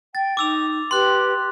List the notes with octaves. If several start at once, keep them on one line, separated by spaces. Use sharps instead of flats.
G5 A6
D#4 D6 E6 F7
G4 B4 G5 C6 F#6